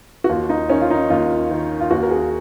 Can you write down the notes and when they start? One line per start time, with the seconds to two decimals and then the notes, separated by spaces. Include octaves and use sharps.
0.24 F#4
0.29 D#2 F4
0.49 D#4
0.70 D#3 C#4
0.81 F4
0.90 D#4
1.10 D#2 F4
1.51 D#3
1.80 F4
1.91 D#2 F#4
2.02 A#4
2.11 G#4